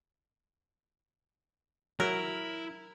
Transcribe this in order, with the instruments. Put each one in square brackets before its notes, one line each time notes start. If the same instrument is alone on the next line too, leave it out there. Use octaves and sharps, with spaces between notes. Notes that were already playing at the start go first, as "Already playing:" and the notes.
[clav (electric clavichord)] F#3 [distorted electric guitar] E4 [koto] A#4